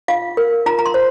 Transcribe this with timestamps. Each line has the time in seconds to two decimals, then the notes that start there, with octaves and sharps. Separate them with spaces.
0.08 F4 F5
0.37 A#4
0.66 F4 A#5
0.79 A#5
0.86 C6
0.94 C5